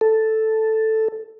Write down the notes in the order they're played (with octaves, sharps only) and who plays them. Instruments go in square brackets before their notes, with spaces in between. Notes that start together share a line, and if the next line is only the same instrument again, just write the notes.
[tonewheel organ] A4